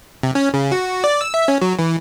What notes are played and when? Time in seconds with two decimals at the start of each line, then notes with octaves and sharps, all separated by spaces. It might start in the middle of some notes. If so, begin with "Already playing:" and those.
0.23 C3
0.35 C#4
0.54 C#3
0.72 F#4
1.04 D5
1.21 E6
1.34 E5
1.48 C#4
1.62 F#3
1.79 E3